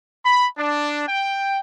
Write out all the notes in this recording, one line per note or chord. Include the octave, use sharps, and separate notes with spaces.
B5
D4
G5